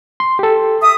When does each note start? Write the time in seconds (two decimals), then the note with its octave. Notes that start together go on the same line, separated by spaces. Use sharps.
0.20 C6
0.39 G4 A4
0.82 E5 D#6